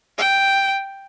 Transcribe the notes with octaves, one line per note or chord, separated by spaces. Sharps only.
G5